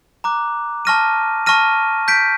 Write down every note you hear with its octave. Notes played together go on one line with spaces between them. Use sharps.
A#5 D6 F#6
A5 C#6 F6 A#6 D#7
A5 C#6 F6 A#6 D#7
G6 B6 D7